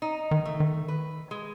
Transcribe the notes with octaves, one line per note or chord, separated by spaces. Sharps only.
D#4
D#3
A3
D#3
B4
G#3